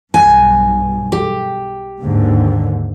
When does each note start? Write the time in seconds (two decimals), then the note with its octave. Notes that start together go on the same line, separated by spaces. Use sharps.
0.14 B1 G2 G#5
1.12 G4
2.01 D#2 G#2 D3